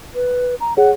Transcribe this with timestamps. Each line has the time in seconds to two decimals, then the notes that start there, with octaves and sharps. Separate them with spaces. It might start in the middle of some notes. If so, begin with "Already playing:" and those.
0.15 B4
0.60 A#5
0.77 G#4 C#5 F#5